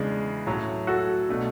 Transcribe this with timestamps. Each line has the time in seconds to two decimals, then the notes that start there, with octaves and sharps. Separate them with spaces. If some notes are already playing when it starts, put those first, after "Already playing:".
Already playing: E2 C#3 G#3 D4
0.47 A2 F#3 C#4
0.87 F#4 A4
1.29 B2 A3 D4